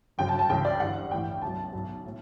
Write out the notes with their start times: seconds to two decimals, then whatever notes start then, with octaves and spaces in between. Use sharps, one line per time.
0.18 G1 F#2 C#3 F#3 G5
0.29 A5
0.39 A5
0.50 C#2 C#3 E3 G5
0.65 D5
0.80 G1 G2 E3 F#5
1.11 A1 A2 E3 G5
1.42 C#2 B2 F#3 A5
1.73 B1 B2 F#3
2.06 A2